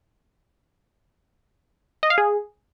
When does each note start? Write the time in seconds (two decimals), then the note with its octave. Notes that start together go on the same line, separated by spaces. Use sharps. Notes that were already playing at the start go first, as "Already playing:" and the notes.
2.03 D#5
2.10 F5
2.18 G#4